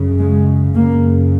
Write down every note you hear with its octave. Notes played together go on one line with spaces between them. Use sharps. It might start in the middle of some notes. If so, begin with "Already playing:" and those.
Already playing: F#2 C#3
G#3
F#2 C#3 A#3